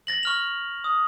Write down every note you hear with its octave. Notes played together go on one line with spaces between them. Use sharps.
A6 A#6 F#7
C#6 F6 F7
D#6